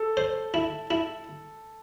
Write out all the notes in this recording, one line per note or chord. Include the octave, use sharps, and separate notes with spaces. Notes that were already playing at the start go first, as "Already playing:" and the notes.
Already playing: A4
C5
E4
E4